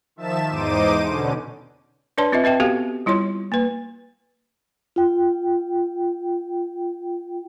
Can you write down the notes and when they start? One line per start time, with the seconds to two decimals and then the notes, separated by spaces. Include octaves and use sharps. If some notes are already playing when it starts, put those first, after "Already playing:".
0.16 D#3 F3 E5 A5 E7
0.49 E2 G#2 D#4 C5 D6 D#7
1.04 B2 D3 C#4
2.18 D4 B4 C#5 D5 A5 C6
2.32 C4 F4 B4 D#5 E5
2.44 C4 B4 E5 G5 A5
2.60 B3 F#4 G4 A4 F5
3.06 G3 E4 F4 C#5 C6
3.52 A#3 B4
4.96 F4 G5